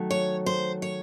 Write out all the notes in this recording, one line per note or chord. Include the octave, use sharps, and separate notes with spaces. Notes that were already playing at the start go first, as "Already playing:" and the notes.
Already playing: D#3 F#3 A3
C#5
C5
C#5